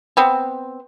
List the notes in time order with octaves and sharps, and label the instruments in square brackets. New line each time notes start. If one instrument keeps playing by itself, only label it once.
[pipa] B3 C4